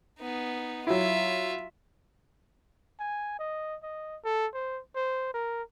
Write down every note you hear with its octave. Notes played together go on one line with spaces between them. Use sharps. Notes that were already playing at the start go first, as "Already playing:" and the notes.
B3 D#4
F#3 E4 F4 E5
G#5
D#5
D#5
A4
C5
C5
A#4